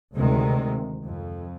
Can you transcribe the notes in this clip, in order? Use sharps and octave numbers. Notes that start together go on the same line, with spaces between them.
D2 C3 D#3 G#3
F2